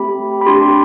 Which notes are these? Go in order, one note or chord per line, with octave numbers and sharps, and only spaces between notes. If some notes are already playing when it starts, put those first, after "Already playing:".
Already playing: A3 C4 G4 B5
B5
D4 G4 C6